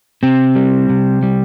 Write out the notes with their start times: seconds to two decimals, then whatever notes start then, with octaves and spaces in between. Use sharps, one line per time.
0.23 C3 C4
0.55 G3
0.90 C3
1.23 G3